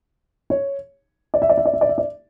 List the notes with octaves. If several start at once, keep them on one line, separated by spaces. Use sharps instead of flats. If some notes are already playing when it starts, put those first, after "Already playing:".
C#5
D5
E5
D5
E5
D5
E5
D5
E5
D5